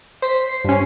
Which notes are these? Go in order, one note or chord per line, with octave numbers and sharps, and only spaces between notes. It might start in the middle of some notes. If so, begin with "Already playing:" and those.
C5 B6
C7
G2 C#4